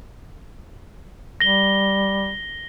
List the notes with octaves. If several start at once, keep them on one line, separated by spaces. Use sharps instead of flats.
G3 A#6 G7